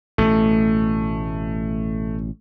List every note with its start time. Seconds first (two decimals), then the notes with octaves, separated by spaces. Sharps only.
0.18 A1 B2 A3